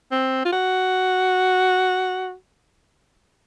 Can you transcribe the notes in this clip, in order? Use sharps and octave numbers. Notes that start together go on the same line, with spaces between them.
C4
F4
F#4